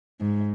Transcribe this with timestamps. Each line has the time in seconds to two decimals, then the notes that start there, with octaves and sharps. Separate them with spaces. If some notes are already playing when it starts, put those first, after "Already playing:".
0.21 G#2